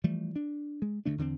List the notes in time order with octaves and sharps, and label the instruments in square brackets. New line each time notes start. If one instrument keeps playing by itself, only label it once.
[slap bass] E3 F3 G3 A3
D4
G#3
D2 D3 A3 D4
E2 D3 A#3 C4